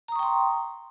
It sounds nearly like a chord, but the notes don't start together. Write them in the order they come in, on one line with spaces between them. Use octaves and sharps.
A#5 D#6 C#6 G5 C6